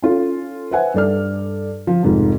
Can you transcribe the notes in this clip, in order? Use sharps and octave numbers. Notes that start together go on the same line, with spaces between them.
C#4 F4 A4
B4 C5 E5 F#5 G#5
G2 A4 D5 F6
F3
F1 G#2 F3